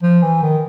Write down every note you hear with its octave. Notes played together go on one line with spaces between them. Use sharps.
F3
E3
D#3